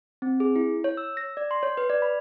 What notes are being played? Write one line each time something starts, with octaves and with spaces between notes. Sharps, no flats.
C4
G#4
E4
C#5
E6
A#6
D5
C6
C#5
B4
D5
B5